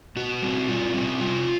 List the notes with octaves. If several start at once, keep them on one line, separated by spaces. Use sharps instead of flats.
B2 F#4
G3 C4
B2 F4
G3 C4
C3 F4